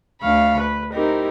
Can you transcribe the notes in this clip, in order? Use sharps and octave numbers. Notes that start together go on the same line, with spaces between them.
D2 D3 A3 F5 B5 C#6
B4
C4 D#4 E4 G4 A#4